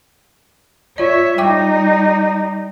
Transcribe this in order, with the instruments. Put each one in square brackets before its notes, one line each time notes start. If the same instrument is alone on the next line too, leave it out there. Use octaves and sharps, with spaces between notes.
[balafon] F4 D5 [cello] C#5 E5
[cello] G3 D#4 [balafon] G5 D6